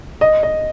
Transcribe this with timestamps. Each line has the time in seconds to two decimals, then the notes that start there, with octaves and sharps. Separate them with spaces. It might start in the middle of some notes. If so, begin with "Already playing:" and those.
0.21 D#5
0.43 D#5